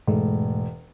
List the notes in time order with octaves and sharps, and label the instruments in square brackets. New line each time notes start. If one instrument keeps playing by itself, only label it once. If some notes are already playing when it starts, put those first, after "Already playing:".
[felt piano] E1 [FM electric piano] G#2 G#3 A3